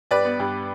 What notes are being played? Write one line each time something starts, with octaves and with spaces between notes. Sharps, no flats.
G2 B4 D5
B3
G2